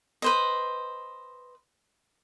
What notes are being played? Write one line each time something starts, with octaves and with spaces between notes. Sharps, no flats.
B4 C5 D#5